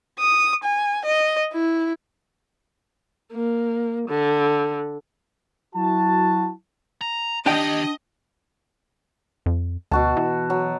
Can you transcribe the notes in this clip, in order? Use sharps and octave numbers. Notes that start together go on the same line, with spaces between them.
D#6
G#5
D#5
E4
A#3
D3
F#3 E4 F#4 A5
A#5
D#3 D4 G4 D#5 G5
F2
D2 B2 F#4 A5
E3
F#3